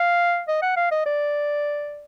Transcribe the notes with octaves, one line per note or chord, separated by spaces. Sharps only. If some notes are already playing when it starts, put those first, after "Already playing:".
Already playing: F5
D#5
F#5
F5
D#5
D5